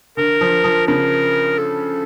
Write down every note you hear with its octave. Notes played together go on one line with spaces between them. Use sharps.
D3 A#4
F3
F3
C#3 A#4
A4